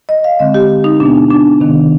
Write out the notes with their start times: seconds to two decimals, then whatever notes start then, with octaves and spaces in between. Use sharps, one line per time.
0.09 D#5
0.24 F5
0.39 D3 G#3 C4 D#5
0.54 G4
0.84 D#4
1.00 B2 B3 D4
1.30 D4
1.60 C3 D#3 B3